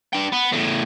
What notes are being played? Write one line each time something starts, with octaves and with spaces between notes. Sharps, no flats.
D4 G5
B3
E2 A2